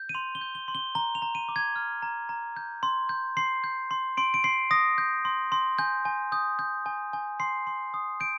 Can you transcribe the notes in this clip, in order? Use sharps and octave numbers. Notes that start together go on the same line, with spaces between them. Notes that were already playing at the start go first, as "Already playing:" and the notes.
Already playing: G6
D#7
C6 F7
G7
G6
G7
C6
G7
A#5 G7
F7
A#5
D#7
D6
G#6
F6
A#5
A#5
G6
C6
G6
C6 C7
G6
C6
C6 D7
D7
C6 C7
D#6 A#6
G6
C6
C6
G#5 G6
G#5
D#6 G6
G6
G#5
G#5
C6 C7
C6
D#6
G6 D7